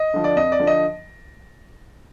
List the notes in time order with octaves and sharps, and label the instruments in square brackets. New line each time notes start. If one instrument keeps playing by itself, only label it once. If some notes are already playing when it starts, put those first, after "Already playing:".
Already playing: [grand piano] D#5
D3 F3
D5
F2 D#5
D5
D3 F3
D#5